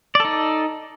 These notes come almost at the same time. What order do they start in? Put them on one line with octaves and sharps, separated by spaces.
D5 A4 D#4